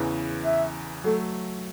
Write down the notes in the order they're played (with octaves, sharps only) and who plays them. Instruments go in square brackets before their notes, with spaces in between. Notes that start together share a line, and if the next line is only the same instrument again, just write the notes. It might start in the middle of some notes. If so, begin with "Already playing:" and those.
Already playing: [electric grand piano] E2 C#3 E3
[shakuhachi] E5
[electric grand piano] F#3 A3 [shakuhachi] A4